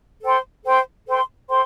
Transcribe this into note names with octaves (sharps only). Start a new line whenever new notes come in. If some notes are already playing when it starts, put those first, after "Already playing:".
A4 C5 G5 C6
A4 C5 G5 C6
A4 C5 G5 C6
A4 C5 G5 C6